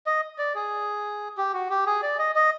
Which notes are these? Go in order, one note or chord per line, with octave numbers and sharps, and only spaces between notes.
D#5
D5
G#4
G4
F#4
G4
G#4
D5
D#5
D#5